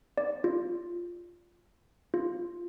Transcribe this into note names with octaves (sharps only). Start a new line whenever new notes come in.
D5
F4
F4